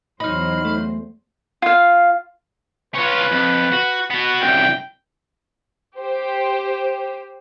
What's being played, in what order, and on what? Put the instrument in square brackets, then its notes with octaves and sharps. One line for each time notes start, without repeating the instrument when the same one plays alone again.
[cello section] E2 F#3 C5 [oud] D#4 [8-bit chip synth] B5 F6
[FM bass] A3
[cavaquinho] F4 F5
[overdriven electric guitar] C#4 F4 [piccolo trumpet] B4
[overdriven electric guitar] F2
F#4
B3 F#4
[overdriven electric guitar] C2 F#2 [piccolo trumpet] G5
[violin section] G4 C5